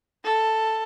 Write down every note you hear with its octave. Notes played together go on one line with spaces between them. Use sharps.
A4